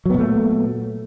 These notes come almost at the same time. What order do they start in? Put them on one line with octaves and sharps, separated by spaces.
F#3 B3 A#2 A3